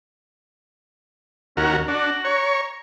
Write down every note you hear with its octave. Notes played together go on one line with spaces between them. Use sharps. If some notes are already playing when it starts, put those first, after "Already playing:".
D#2 C#4 F#4 A#4
D4 F#4
C#5 A#5